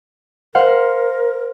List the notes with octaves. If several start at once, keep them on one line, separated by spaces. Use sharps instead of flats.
A#4 C5 F5 F#5